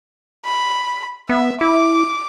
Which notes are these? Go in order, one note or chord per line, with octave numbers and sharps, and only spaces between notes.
B5
B3 E5
E4 D6